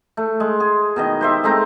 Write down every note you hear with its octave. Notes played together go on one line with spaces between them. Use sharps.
A3
G#3
G#4
B2 D#3 D#5
G4 C5 E5
G#3 A3 C4 A#5